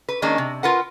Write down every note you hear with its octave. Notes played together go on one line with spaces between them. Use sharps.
B4
D#3 G#3 A#3 C#4 D4
C3
F4 A#4 B4 F#5